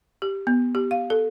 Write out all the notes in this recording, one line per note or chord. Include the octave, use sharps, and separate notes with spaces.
G4
B3
G4
F5
A4